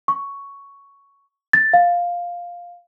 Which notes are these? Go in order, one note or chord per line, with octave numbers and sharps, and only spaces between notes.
C#6
A6
F5